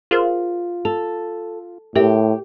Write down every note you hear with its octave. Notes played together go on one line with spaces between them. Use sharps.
F4 G#4 A#4 C5
A4 F7
A2 G4 A#4 E5